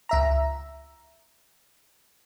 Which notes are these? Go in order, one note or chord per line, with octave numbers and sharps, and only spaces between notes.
C#2 E5 A#5